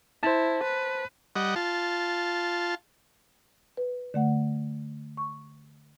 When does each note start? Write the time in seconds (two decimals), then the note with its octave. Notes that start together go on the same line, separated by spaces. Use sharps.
0.23 E4 C5 A5
0.64 B4
1.36 G3 D#5 F#5
1.56 F4 A5
3.77 B4
4.14 D3 A3 F#5
5.17 C#6